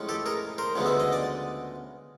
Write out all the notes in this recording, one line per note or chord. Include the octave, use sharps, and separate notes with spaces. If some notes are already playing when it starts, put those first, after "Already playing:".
Already playing: A2 F3 G#3 C#4
G4 A4
G#4 A#4
A#4 C5
D2 C#3 F3 G#3 B3
E5
D#5
D5